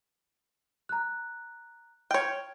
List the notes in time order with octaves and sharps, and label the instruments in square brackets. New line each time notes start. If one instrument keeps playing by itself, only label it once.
[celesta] A#5 F#6
[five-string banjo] C#5 G5 [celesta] F6 G6 G#6